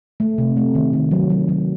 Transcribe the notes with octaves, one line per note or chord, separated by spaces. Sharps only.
A3
C3
A3
D#3
D#3
F#3
F#3
F#3